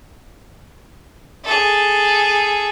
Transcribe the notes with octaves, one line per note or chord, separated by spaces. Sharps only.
G#4 A4